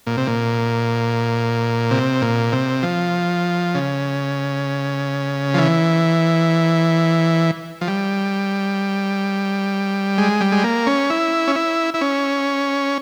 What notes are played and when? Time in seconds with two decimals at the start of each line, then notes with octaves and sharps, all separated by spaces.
0.07 A#2
0.17 C3
0.27 A#2
1.91 C3
2.22 A#2
2.52 C3
2.83 F3
3.75 C#3
5.54 F3
5.58 E3
7.81 F3
7.88 G3
10.18 G#3
10.41 G3
10.52 G#3
10.64 A#3
10.86 C#4
11.10 E4
11.47 C#4
11.56 E4
11.94 E4
12.01 C#4